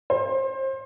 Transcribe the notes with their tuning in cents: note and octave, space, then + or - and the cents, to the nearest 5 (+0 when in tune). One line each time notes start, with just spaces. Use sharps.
C5 +30